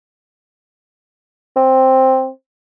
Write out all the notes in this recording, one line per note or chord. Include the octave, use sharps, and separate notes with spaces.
C4